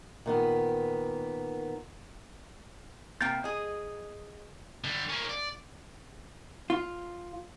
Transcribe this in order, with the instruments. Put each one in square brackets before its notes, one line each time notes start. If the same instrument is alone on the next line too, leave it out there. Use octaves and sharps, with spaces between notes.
[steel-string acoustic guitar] A#2 D#3 B3
[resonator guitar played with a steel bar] C3 A#3 G5 [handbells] G6 A6
[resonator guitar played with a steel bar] G#4 D#5
[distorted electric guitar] D3 G3
A#3 C#4
D5
[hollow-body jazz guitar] F4